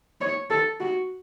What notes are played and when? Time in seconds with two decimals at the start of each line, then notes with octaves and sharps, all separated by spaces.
0.21 C#5
0.50 A4
0.80 F#4